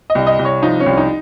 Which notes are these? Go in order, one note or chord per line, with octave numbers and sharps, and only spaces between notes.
D#5
C2
D#5
C2
C#5
F3 D#4
C#4
C2
D#4